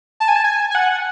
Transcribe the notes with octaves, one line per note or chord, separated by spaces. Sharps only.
A5
G#5
A5
G#5
G#5
F#5